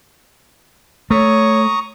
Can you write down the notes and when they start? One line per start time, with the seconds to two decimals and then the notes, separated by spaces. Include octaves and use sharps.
1.11 A3 C#5 A#5 C#6 D#6